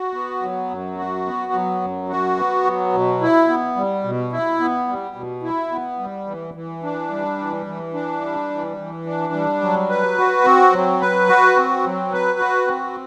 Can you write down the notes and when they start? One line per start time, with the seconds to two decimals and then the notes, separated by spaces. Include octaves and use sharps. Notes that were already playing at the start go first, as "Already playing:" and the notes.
Already playing: F#4
0.14 B3
0.42 F#3
0.70 F#2
0.97 F#4
1.26 B3
1.53 F#3
1.81 F#2
2.09 F#4
2.37 B3
2.65 F#3
2.93 B2
3.21 E4
3.48 B3
3.77 G3
4.04 B2
4.32 E4
4.60 B3
4.88 G3
5.16 B2
5.43 E4
5.72 B3
5.99 G3
6.27 E3
6.54 E3
6.83 D4
7.10 G3
7.38 E3
7.66 E3
7.94 D4
8.21 G3
8.50 E3
8.77 E3
9.06 D4
9.33 G3
9.61 F#3
9.89 B4
10.17 F#4
10.45 C4
10.72 F#3
11.00 B4
11.28 F#4
11.56 C4
11.84 F#3
12.12 B4
12.39 F#4
12.67 C4